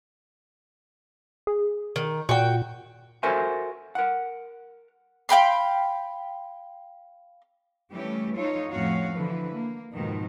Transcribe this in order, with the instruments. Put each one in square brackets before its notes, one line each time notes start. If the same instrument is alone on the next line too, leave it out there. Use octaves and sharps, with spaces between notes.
[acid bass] G#4
[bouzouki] D#3
[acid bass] A#2 [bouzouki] F#4 G5
[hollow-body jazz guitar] F#4 A4 A#4 C5 E5 G#5
A#4 F#5
[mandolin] F5 G5 B5 C6
[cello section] E3 G3 A3 C#4 G4
D#4 F4 A4 C#5
F2 A2 C#4 F#4 C#5 F5
D3 E3 F3 B4
A#3
F2 G#2 B2 D#3 F3